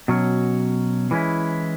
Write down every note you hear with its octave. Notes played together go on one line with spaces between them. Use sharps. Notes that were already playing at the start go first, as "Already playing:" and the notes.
B2 F#3 C#4
E3 G#3 C#4 E4